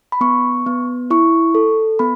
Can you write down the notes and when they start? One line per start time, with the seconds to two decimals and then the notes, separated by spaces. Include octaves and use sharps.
0.12 B5
0.21 B3 C#6
0.66 B3
1.10 E4 C#6
1.55 A4
1.99 B3 B5